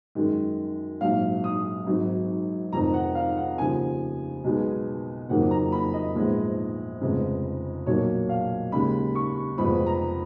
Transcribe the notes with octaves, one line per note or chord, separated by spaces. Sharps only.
F#2 D#3 G#3
A#1 G#2 F#3 F5
D#6
G#1 G#2 F#3
F1 F2 D#3 A#5
F#5
F5
F#5
D#2 C#3 F3 G#5
B1 B2 G#3 B3
F#1 F2 D#3 F#3 A#3 F#5
A#5
B5
D#5
A#1 G#2 F3 G#3 B3
F1 F2 C#3 G#3 B3
B1 A#2 F#3 A#3 C#5
F5
D#2 C#3 G#3 B5
C#6
F1 F2 F3 G#3 B3 B5
A#5